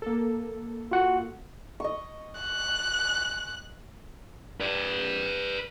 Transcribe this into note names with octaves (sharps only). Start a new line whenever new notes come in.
A#3 A4
F4 F#4 F#5
D#5 C#6
F#6
B4 D5